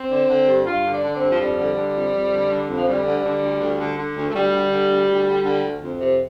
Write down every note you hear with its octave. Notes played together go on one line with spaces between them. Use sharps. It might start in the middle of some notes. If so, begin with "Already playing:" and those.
Already playing: C4
D3
D3
G2
G2 F4
D3
D4
D3
C4
G2
F3
F2 G3
D3
D3
F2
F2
D3
D3
F2
F3
D2 G3
D3
D3
D2
D2
D3
D3
D2
A3
D2 G3
D3
D3
D2
D2
D3
D3
D2
F2
C3